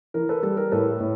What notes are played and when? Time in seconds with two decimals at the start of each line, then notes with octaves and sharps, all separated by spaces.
0.14 E3 A#4
0.29 A4 B4
0.43 G3 A4
0.57 A#4
0.72 A2 A4 B4
1.00 A2